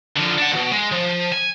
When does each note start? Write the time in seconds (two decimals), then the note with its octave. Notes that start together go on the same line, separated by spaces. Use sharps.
0.17 D3 F3
0.38 D4 F#5
0.52 B1 B2
0.72 G#3
0.92 F3
1.32 G#5